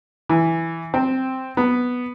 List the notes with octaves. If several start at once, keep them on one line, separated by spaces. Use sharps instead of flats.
E3
C4
B3